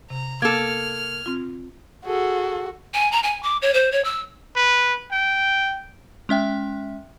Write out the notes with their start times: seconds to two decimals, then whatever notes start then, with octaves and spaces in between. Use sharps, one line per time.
0.10 C3 A#5
0.42 A#3 A4 F6 G#6
1.26 C4 F4
2.05 F#4 G#4 A4
2.94 G#5
3.12 A#5
3.23 G#5
3.42 D6
3.62 C#5
3.73 C5
3.92 C#5
4.04 E6
4.56 B4
5.12 G5
6.29 G#3 C#4 E5 G5